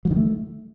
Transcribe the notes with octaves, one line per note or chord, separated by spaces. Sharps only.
F#3
D#3
A3